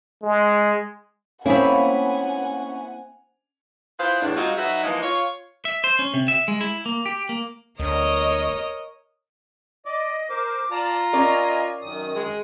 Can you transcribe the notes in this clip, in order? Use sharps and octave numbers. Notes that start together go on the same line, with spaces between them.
G#3
A#3 C4 C#4 E4 G#4 F#5 G#5 B5
E4 F4 G#4 B4 C5
E2 A2 D4
G3 G#3 C4 D#4 F4 F#4
F#3 D#4 F#4 B4 E5
E3 F3 G#3 A#3 D#4
F4 C#5
E5
C5
C#4
C3
E5
G#3
E4
A#3
G4
A#3
D2 A#4 C#5 D#5
D5 D#5
A#4 C5 D6
F4 D5 A5 A#5
C#4 A#4 D5 D#5 G#5
F#2 D#3 D#6
G#3